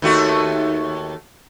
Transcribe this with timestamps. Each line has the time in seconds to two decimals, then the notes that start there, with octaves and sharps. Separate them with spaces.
0.02 D#2 A3 F#4